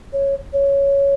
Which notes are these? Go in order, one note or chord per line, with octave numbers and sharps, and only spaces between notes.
C#5
C#5